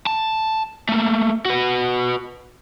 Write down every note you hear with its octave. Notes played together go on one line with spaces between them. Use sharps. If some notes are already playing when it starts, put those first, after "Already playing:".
A5
A3 A#3
F#4 B4